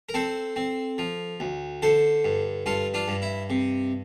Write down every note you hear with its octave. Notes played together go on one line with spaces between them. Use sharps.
A#4
C4 A4 C5
C4
F3
D2
D3 A4 C5
G2
G2 F4 A4
D4 F4
G2
E4
C3